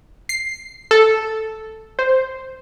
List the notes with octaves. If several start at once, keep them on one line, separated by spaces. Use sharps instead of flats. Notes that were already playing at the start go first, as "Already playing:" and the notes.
C7
A4
C5